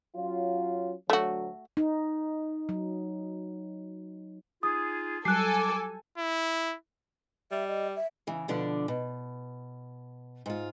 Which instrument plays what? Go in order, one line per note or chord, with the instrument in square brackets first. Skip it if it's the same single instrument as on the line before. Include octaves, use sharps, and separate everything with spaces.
[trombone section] F#3 C#4 F4
[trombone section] D2 F#3 [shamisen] A3 F#4
[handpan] D#4
F#3
[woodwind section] D#4 F4 G#4 [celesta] D#6
[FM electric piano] F#3 G3 [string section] A4 G#5 [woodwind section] D6 [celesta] F#6 C7
[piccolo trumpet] E4
[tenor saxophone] G3 [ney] E5
[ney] D#5
E5
[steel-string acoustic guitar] C#3 E3
B2 D3 F3 D4
B2
G#2 F4